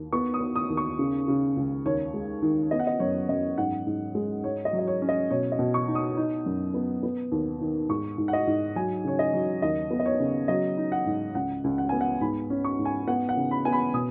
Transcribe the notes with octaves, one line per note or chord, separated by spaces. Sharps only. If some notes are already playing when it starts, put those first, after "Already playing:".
Already playing: D#2
B3 C#6
D#6
B3
D#6
D#2
C#6
C#3
C#3
C#2
D#2 C#5
G#3
D#3
B3 D#5
F#5
D#5
F#2 C#5
F#2 D#5
G#2 F#5
G#2
G#3
G#2 C#5
D#5
F#3
D#5
C#5
C#4
D#5
B2 C#5
D#5
B2
C#6
D#4
D#6
D#4
F#2
B3
B3
D#2
D#3
G#2 C#6
G#2
F#5
D#5
G#2
F#3 G#5
C#3 C#5
D#5
F#3
D#2 D#5
B3
D#5
C#5
C#3
F#3 D#5
D#4
F#5
G#2
C#2 F#5
C#2
F#5
B3 G#5
F#5
G#2 B5
C#4
C#6
G#2
G#5
B3 F#5
F#5
C#3
B5
B3 G#5
B5
B2 D#6